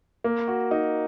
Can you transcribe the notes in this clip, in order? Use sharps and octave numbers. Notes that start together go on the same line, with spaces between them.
A#3
F#4
D#4